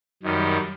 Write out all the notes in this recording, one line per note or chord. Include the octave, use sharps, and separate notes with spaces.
F#2 D#3 G3